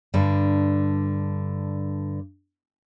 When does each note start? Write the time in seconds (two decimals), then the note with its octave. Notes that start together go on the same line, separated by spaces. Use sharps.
0.14 G2 D3